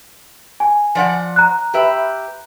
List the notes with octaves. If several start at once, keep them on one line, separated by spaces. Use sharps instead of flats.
G#5
F3 D5 F#5
A#5 F#6
G4 B4 E5